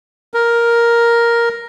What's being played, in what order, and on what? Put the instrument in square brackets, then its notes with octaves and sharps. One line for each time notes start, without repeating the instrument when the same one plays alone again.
[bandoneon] A#4